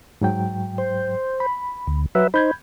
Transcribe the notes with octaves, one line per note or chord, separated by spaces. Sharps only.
G#2 F#3 G5
C5
B5
D2
F#3 B4 E5
D#4 C5 B5 G6 G#6